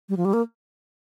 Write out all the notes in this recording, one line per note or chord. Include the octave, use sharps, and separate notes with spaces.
G3
F3
G3
A#3